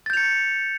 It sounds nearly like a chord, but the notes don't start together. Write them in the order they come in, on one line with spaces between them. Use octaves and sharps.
A6 G6 F7 C#7